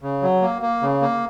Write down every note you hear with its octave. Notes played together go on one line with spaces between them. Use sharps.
C#3
F#3
A#3
A#3
C#3
A#3